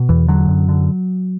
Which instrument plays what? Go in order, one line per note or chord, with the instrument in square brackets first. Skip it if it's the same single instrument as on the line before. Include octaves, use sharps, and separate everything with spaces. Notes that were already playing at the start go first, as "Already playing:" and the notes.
Already playing: [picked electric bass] B2
E2 E3
D3 F#3
F#2
D3